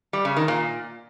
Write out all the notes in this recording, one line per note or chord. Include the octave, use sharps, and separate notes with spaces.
G3
C#3
D#3
A#2